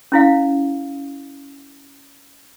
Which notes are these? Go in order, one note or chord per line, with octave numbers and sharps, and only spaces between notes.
C#4 E4 F5